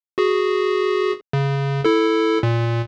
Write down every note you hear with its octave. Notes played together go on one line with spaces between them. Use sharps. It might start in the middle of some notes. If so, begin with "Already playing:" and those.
F#4 G#4
C#3
E4 A4
A#2